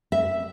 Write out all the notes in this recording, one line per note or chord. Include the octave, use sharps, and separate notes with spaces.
E5